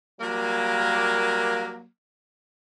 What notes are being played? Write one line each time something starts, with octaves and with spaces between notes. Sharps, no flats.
F#3 G3 A#3